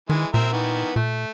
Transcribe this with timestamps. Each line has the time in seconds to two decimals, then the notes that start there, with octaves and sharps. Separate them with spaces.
0.10 D#3 E3 G#3
0.34 A#2 C4 A#4 E5
0.53 D#3 E3 B3
0.96 A#2 A3